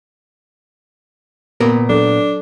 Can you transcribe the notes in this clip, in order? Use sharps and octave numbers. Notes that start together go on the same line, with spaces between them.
A#2 B3 A#4
F#3 D4 A4